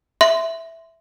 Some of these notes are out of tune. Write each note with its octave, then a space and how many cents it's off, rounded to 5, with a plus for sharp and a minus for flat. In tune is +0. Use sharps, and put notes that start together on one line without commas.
E5 +0 C6 -15